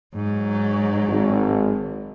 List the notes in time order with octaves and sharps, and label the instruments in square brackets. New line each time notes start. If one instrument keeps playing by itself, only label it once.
[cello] G#2 F#3
[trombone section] G#1